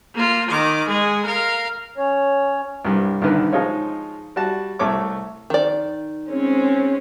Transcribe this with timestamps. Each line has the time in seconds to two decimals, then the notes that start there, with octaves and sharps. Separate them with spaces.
0.14 A#3 F4
0.50 D#3 D6
0.88 G#3 G#4
1.26 A#4 F5
1.98 C#4 C#5
2.85 C2 G2
3.22 C2 D3 D#3 B4
3.53 F3 G#3 D#4 F4 C#5
4.36 G3 F#4 A5
4.79 C2 A3 A4 C#5 D6
5.50 D#3 D5
6.30 G#3 C4 C#4